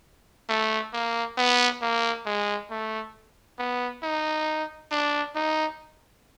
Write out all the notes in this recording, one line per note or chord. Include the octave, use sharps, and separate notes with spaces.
A3
A#3
B3
A#3
G#3
A3
B3
D#4
D4
D#4